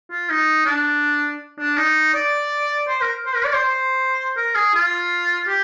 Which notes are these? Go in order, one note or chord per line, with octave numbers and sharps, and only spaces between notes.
F4
D#4
D4
D4
D#4
D5
C5
A#4
C5
A#4
D5
C5
C5
A#4
G#4
F4
G4